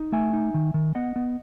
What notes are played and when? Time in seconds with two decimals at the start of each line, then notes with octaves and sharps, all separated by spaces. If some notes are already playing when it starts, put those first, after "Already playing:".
Already playing: D#4
0.12 A3 E5 G#5
0.33 D#4
0.54 D#3
0.74 D#3
0.95 B3 D#5 F#5
1.16 B3